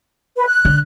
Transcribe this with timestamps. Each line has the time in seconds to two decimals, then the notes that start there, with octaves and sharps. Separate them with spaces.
0.37 B4
0.48 F#6
0.65 D3